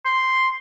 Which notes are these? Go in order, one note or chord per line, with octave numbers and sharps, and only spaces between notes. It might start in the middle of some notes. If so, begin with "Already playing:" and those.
C6